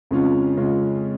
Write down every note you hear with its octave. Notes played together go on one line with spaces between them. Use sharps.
F2 C#3 G#3 C#4 F4
C#3 G#3 C#4 F4